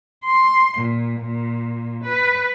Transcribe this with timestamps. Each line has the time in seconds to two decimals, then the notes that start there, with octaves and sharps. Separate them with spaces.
0.25 C6
0.77 A#2
1.20 A#2
2.04 B4